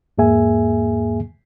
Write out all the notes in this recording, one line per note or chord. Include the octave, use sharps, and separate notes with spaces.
E2 G#2 A#3 G#4 E5 G#5